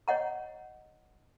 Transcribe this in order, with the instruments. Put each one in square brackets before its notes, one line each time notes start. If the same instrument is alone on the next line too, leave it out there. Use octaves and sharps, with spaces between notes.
[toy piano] C#5 D#5 F#5 A#5